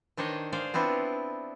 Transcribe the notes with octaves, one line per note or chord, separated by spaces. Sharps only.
D#3 D4 C5 C#5 D#5
G#4 C5 D5 F5
B3 C4 D4 E4 F4